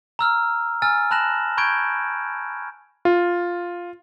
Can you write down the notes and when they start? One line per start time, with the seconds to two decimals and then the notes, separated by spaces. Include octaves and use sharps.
0.19 A#5 E6 F6
0.82 G#5 E6 F6 A6
1.11 A5 B5 F#6 A#6 E7 F#7
1.57 A#5 B5 C#6 G6 G#6 D7
3.05 F4